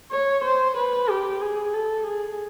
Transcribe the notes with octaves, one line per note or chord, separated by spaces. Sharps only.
C#5
C5
B4
G4
G#4
A4
G#4